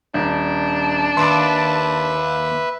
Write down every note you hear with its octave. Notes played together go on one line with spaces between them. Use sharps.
D#1 D4
D#2 B4 E5 C6 D6